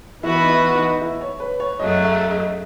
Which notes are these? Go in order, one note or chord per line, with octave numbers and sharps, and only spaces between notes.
E3 B3 E4 F#4 B4
D#4
E4
D#4
E4
C#5
B4
C#5
F#2 C#3 F#3 A3 D#5
E5
D#5